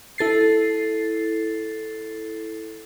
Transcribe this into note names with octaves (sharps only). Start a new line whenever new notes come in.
E4 A4 A6 C7